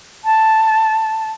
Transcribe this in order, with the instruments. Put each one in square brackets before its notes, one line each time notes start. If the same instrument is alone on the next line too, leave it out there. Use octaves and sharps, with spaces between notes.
[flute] A5